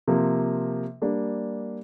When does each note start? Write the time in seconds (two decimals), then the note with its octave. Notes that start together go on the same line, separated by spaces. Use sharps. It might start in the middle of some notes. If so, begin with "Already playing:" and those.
0.08 C3 F3 A#3
1.02 G3 A#3 D4